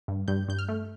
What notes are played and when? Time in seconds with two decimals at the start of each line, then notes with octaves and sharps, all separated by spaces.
0.08 G2
0.28 G2 G6
0.48 G2 G6
0.59 F6
0.69 A3